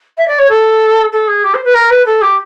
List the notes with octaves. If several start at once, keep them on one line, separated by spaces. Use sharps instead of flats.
E5
D5
C#5
A4
A4
G#4
G4
C5
B4
A#4
B4
A4
G4